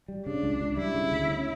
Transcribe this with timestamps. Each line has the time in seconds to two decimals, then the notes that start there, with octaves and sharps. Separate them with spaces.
0.08 G3
0.26 C#3 D4
0.43 C#2
0.61 C#2
0.77 G3 E4
0.95 C#3
1.12 D2
1.29 C#4